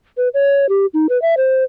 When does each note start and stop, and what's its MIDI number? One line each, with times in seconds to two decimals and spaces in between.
0.17 0.28 71
0.34 0.69 73
0.69 0.86 67
0.94 1.07 63
1.09 1.20 71
1.22 1.35 76
1.37 1.64 72